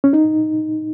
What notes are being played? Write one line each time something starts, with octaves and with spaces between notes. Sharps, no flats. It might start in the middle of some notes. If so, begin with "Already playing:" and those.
C#4
D#4